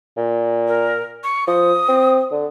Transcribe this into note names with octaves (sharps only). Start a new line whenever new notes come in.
A#2
A#4
C#6
F3 D#6
C4
D3